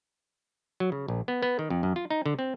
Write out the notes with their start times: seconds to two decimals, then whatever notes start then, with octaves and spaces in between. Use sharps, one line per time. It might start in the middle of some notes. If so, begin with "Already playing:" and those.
0.80 F#3
0.92 C#3
1.08 A#1
1.28 B3
1.43 B3
1.59 D#3
1.70 F2
1.83 F#2
1.96 F4
2.11 D#4
2.26 D3
2.39 C4